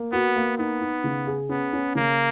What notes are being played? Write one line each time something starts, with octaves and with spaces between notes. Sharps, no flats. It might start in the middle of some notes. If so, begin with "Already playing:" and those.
Already playing: A#3
B3 F#4
A#3
B3 D#4
D#4
C#3
G#4
B3 C#4
C#4
C#3 A#3